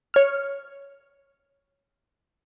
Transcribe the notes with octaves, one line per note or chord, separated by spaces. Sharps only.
C#5 F6